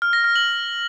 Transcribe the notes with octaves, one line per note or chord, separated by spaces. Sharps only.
F6
A#6
F6
F#7